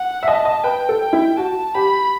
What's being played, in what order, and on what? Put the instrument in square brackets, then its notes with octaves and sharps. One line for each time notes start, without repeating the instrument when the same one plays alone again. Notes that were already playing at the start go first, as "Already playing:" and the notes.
Already playing: [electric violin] F#5
[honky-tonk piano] E5
[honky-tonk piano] D#5 [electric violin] A5
[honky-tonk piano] D#5
[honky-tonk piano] B4 [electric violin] G5
[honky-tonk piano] A4
[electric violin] G5
[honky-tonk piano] E4
[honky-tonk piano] F#4 [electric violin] A5
[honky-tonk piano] G4 [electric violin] B5